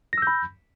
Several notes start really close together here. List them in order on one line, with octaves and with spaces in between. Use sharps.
A#6 E6 G6 B5